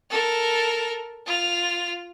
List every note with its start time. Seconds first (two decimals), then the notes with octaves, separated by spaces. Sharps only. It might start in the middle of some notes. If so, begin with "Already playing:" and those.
0.10 A4 A#4
1.26 F4 F7